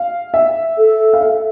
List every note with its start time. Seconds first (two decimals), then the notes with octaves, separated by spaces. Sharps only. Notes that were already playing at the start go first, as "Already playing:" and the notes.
Already playing: F5
0.34 E5
0.78 A4
1.13 F5
1.21 E5